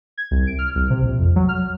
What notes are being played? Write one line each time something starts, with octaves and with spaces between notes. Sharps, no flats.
G#6
C2
D7
F6
C2
C3
A#1
F2
F#3
F6